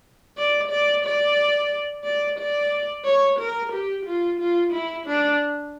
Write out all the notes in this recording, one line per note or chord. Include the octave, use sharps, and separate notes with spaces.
D5
D5
D5
D5
D5
C#5
A#4
G4
F4
F4
E4
D4